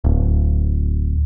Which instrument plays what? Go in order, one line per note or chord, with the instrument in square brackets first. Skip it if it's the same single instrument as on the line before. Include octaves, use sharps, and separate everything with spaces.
[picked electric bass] D1